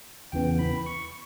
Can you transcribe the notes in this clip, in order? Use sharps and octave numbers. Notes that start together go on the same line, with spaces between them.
E2 C#3 E3 B3 G5
B5
C#6